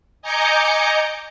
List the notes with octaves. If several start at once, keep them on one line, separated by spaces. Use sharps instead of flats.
D#5 G#5 A#5 D6 G6 C#7